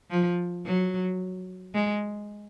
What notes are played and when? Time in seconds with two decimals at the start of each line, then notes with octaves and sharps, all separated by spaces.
0.11 F3
0.66 F#3
1.74 G#3